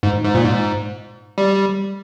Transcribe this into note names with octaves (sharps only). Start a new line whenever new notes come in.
G#2
G#2
A#2
G#2
G3